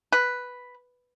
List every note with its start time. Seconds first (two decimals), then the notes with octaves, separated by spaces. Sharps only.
0.12 B4